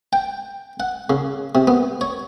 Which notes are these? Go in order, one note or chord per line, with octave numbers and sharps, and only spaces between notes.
G5
F#5
C#3
C3
B3
C#5